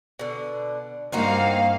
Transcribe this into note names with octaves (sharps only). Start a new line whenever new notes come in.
B2 D3
G2 A#3 C4 D#4 F#4 F5